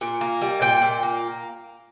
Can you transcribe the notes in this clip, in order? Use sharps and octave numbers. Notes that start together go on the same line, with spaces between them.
A#2
A#3
G3
A#2 G5
A#2
A#3